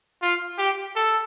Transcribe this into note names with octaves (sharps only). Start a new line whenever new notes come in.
F4
G4
A4